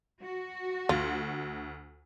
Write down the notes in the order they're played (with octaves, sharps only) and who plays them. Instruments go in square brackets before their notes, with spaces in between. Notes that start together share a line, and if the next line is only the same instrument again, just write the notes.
[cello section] F#4
[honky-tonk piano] D2 [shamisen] F4